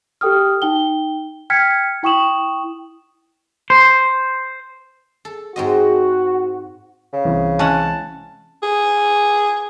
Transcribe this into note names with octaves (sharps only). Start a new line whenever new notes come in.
G4 A4 G5 D#6 F6
D#4 G5 G7
G5 F6 G#6 B6 C#7
E4 G5 C#6 D#6 E7 F#7
C5
A4
G#2 C4 F#4 D#5
C#3
C2 E3 C4
G#3 C#4 F#5 A5
G#4